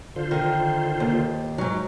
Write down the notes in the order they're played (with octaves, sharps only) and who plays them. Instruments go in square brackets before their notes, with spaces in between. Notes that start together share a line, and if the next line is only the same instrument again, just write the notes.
[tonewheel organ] D3 F4 C5
[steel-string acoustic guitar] D#3
D#2
[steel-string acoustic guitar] G#2 F#3 [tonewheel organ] D#4